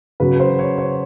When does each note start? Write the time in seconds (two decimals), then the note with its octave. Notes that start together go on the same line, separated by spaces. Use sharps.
0.20 C#3 F#3 B4
0.40 C5
0.59 C#5
0.78 C#5